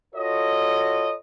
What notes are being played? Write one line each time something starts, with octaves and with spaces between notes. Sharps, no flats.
F4 F#4 A4 C#5 D#5